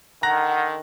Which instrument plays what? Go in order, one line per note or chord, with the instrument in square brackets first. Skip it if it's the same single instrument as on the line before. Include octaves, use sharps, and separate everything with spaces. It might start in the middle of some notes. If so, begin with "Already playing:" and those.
[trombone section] D3 D#3 [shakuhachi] F#5 [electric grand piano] A#5 F#6 A#6